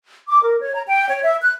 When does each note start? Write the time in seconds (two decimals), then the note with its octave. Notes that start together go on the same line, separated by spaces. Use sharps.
0.28 D6
0.43 A#4
0.61 C#5
0.74 A#5
0.88 G5
1.09 C#5
1.23 E5
1.41 F#6